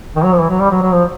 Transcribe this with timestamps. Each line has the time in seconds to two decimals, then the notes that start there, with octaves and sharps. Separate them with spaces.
0.16 D#3
0.24 F#3
0.33 F3
0.41 E3
0.49 F#3
0.61 G3
0.71 F#3
0.82 F#3
0.92 F3